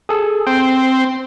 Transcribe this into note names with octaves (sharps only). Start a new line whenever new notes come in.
G#4 A4
C4 G5